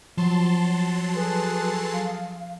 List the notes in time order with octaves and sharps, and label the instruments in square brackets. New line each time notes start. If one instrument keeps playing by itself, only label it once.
[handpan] F3 [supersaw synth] F#3 A5 C6
[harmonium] G#4 A4 [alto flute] B4
[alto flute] F5